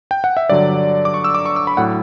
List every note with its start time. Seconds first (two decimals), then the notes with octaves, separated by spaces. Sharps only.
0.11 G5
0.24 F#5
0.37 E5
0.50 G2 D3 F#3 D5
1.05 D6
1.14 C#6
1.24 E6
1.34 D6
1.46 C#6
1.56 E6
1.67 B5
1.77 A2 F#3 F#5